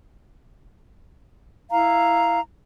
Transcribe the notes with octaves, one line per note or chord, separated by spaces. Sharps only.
E4 F5 A#5